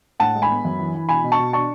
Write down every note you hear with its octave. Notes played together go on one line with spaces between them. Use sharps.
A2 F#5 A5
G#3
G#5 B5
B3
F#2
E3
E3
B2 G#5 B5
B2
A5 C#6
B2
D4 A5 C#6